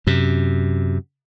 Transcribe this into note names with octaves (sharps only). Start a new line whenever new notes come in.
F#2 C3